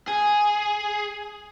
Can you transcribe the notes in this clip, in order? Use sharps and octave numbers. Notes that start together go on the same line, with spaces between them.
G#4